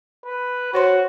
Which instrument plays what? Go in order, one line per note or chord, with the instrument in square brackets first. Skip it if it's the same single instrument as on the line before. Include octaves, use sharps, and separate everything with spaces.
[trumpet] B4
[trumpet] F#4 [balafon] C5 C#5 C6